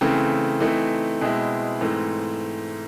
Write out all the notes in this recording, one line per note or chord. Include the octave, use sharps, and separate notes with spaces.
C#3 E3 A3 C4
E3 A3 C4 D#4
B2 G#3 C4 E4
G#2 E3 A3 C4